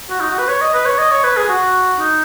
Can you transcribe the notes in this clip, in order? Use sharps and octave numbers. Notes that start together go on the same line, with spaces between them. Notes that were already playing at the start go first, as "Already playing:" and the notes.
F#4
D#4
F#4
B4
C#5
D#5
B4
C#5
D#5
C#5
B4
G#4
F#4
D#4